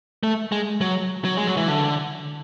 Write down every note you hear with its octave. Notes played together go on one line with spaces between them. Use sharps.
A3
G#3
F#3
F#3
G#3
F#3
E3
D3